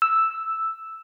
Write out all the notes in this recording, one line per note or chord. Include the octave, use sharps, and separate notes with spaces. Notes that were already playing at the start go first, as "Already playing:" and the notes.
E6